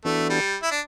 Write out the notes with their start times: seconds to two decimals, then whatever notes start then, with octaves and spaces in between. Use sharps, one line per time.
0.05 E3 A3 B3 D4 F#4 A4
0.30 G3
0.62 E4
0.71 D4